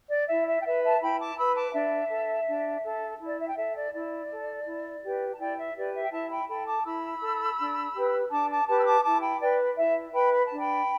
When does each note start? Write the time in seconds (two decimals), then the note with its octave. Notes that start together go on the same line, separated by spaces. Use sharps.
0.10 D5
0.28 E4 E5
0.47 E5
0.61 G5
0.65 B4 E5
0.83 E5 A5
1.01 E4 G5 B5
1.20 A5 D6
1.37 B4 B5 E6
1.56 A5 D6
1.74 D4 E5
2.10 A4
2.48 D4
2.84 A4
3.21 E4
3.26 D5
3.39 E5
3.49 G5
3.57 A4 E5
3.76 D5
3.93 E4 D5
4.30 A4
4.67 E4
5.03 G4 B4
5.33 A5
5.39 E4 D5 G5
5.57 E5
5.76 G4 B4 D5
5.94 E5
6.03 G5
6.12 E4 E5 A5
6.31 G5 B5
6.49 A4 G5 B5
6.66 A5 D6
6.85 E4 B5 E6
7.21 A4
7.59 D4
7.94 G4 B4
8.31 D4 A5 D6
8.50 A5 D6
8.67 G4 B4 A5 D6
8.78 E6
8.86 A5 D6
9.04 E4 A5 D6
9.22 G5 B5
9.40 B4 D5 G5
9.77 E4 E5
10.14 B4 G5 B5
10.32 B5
10.46 D4 A5
10.59 G5 B5